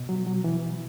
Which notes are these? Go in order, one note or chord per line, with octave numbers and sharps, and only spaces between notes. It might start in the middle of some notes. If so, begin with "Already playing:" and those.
Already playing: B2
F#3
F#3
E3